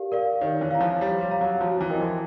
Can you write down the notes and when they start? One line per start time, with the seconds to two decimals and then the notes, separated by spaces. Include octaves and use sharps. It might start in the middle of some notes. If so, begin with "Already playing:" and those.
Already playing: G4 A#4 D5 F5
0.12 A#4 D5 F5
0.41 D#3 C#5
0.61 E3
0.71 F5 A#5
0.81 F3
1.01 G3 C#5
1.21 G3
1.31 F5 A#5
1.41 F#3
1.61 F3 F#4
1.81 E3
1.90 A#4 D#5 G5
2.01 F3